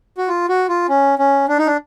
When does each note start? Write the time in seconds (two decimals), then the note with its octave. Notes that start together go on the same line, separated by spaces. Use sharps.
0.18 F#4
0.28 F4
0.49 F#4
0.69 F4
0.89 C#4
1.19 C#4
1.48 D4
1.58 D#4
1.67 D4